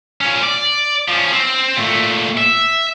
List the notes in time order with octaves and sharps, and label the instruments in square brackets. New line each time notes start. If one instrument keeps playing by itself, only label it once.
[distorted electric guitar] A#2 C#4
D5
F3 C#4
C4
A#2 A3
E5